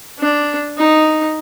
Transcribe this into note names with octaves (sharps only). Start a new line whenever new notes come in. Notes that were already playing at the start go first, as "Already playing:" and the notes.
D4
D#4